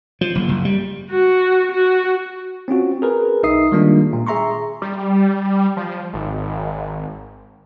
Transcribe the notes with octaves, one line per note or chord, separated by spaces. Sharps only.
F3
F#1
F#1
G3
F#4
F#4
C4 C#4 F4 F#4
G#4 A#4 B4
B1 D#4 E5 D#6 C7
D#3 G3 G#3 A#3 D4 F4
A#2
G#4 E5 A#5 C6 C#6
G3
F3
G#1